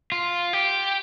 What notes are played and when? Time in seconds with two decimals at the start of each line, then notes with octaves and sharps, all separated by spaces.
0.12 F4
0.53 G4